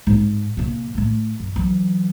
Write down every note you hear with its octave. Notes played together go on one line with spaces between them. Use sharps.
G#2 C4
C3 A#3
A2 A3
F#2
E3 F#3